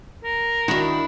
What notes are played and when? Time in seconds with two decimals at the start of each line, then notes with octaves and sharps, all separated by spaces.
0.24 A#4
0.68 D#3 D4 E4 F#4